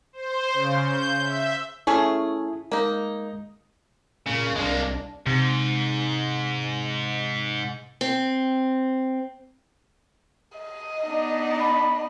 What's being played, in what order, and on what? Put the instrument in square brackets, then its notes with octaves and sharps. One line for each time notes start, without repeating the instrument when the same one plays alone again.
[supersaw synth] C5
C#3
G6
E5
[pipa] A3 C#4 G#4 [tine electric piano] E4
[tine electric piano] G#3 [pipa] A#3 D#4
[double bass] A#2 [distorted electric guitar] C#3
[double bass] C2 D4 [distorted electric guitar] G#3 A#3
[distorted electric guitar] G#2 [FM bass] C3
[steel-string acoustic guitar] C4
[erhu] D#5
[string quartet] B3 D4 D#4
[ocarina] B5